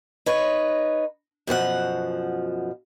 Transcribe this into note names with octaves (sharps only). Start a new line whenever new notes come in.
D#4 B4 C#5
F#2 B2 F3 F#5